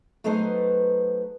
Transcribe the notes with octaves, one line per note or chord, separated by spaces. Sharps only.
F#3 A3 B3 D#4 B4 C5